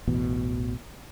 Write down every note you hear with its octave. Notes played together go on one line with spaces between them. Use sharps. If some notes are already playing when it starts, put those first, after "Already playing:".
A1 E2 B2